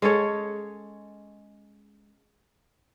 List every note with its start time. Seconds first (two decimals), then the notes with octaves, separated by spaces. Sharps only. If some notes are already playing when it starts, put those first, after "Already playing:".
0.02 G#3 C#4 A4 C#5